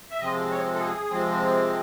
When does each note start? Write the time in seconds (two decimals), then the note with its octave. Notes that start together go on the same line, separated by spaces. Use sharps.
0.10 E5
0.20 C3 F3 G#3 C4 D#5
0.51 C#5
0.74 A4
0.80 G#4
1.10 C3 F3 G#3 C4